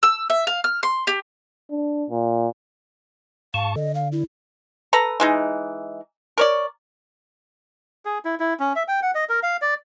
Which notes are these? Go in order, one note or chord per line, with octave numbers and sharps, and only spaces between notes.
E6
E5
F5
F6
C6
G4
D4
A#2
G#2 F5 A5 C#6
D3 D#5
F5
E4
A4 B4 A#5
E3 G#3 D#4
A#4 C#5 D5
G#4
E4
E4
C#4
E5
G5
F#5
D#5
A#4
F5
D5